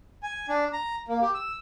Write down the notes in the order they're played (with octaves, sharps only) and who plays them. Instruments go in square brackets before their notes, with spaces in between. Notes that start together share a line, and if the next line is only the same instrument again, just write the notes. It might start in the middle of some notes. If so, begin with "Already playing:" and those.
[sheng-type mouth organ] G#5
D4
A#5
A#3
G4
E6